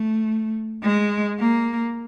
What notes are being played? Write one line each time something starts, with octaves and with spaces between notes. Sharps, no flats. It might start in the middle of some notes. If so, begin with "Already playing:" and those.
Already playing: A3
G#3
A#3